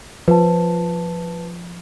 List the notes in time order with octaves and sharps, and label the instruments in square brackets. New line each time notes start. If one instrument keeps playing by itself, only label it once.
[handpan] F3 [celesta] B4 A5